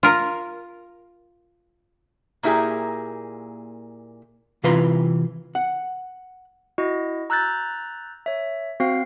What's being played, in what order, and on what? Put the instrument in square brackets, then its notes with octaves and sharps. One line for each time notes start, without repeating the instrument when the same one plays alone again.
[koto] F4 A#4
[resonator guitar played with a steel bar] A#2 A#3 E4 G4 G#4
[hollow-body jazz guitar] C3 E3 F4 B4 A#5 C6
F#5
[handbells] E4 F#4 D#5
A#5 E6 F#6 G6 A6
C#5 E5
C4 F#4 C5 F5 C7